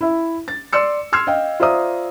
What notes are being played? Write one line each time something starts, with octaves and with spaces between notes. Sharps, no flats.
E4 E5
A6
D5 C6 E6 C#7
C6 E6 F6 G#6 C7
D#5 F5 G5
F4 C5 D5 E5 A#5 D#6